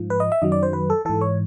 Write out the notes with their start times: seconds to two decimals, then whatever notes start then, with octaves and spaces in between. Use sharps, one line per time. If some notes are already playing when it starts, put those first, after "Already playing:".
Already playing: G#2 F3
0.10 B4
0.20 D#5
0.32 E5
0.42 F#2 D#3 F#3 D#5
0.52 D5
0.63 C5
0.73 B4
0.90 A4
1.05 G#2 E3 A4
1.21 C#5